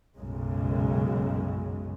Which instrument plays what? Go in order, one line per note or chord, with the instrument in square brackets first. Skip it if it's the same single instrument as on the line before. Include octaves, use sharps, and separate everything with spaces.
[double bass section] B1 F#2 C#3 G#3